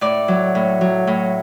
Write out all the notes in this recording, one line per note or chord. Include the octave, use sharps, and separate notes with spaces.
A2 D5
F#3
A2
F#3
A2